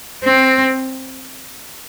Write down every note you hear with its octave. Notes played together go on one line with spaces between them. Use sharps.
C4